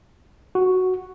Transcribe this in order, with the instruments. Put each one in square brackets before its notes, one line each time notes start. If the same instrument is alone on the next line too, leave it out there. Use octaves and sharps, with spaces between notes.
[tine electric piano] F#4